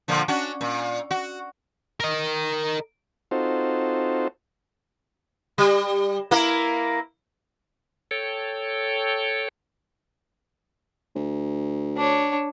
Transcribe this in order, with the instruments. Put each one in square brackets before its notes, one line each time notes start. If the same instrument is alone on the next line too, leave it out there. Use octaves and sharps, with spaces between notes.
[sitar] A#2 D3 F3
C#4 D4 F#4
A#2
F#4
[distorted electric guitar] A#4 D#5
[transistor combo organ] C4 D#4 F4 F#4 A4 C5
[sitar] G3
A#3 E4 A#4
[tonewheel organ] A4 C#5 G5
[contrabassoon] D2
[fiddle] D4 C#5